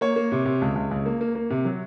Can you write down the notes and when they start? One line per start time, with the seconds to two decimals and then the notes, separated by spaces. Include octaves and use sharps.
0.01 A#3 C#5
0.16 A#3
0.32 C3
0.45 C3
0.62 C#2
0.76 C#2
0.91 C#2
1.06 A#3
1.21 A#3
1.35 A#3
1.50 C3
1.65 F#3